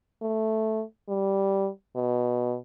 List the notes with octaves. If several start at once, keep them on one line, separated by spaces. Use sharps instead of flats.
A3
G3
B2